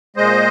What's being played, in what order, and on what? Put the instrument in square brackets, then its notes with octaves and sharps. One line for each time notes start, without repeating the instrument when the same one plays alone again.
[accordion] A#2 G#3 C5 D#5